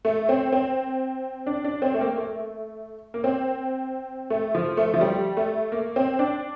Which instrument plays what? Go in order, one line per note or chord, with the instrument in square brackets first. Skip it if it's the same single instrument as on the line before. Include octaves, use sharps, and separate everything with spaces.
[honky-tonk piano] A3
C4
C4
D4
D4
C4
A3
A#3
A3
A#3
C4
A3
F3
A3
F3
G3
A3
A#3
C4
D4